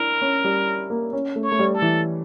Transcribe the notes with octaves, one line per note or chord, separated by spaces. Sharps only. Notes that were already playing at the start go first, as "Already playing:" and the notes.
Already playing: D4 E4 A#4
C#4
G3
A#3
C#4
A3
C#5
A3
G3
A4
E3